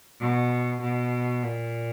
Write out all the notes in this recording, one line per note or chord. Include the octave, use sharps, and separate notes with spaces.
B2
B2
A#2